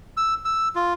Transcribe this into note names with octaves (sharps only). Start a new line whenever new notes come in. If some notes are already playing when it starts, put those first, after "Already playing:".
E6
E6
F4